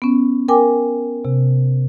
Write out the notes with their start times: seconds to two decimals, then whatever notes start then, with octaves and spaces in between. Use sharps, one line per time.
0.02 B3 C#4
0.48 A#4 G5 G#5 D6
1.25 C3